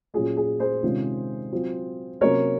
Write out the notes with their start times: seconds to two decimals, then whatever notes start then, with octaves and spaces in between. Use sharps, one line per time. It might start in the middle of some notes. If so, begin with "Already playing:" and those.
0.14 A#2 F#3 C#4 F4 G#4
0.37 G#4
0.60 G#4 C5
0.83 C3 D#3 G#3 C#4 F4
1.52 F#3 C4 F4
2.21 C3 F#3 A#3 C#4 A#4 C#5